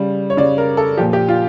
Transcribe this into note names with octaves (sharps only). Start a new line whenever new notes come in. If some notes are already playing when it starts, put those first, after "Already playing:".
Already playing: C#3 G3
C#5
C#3 G3 D5
A#4
A4
A#2 F3 G4
G4
F4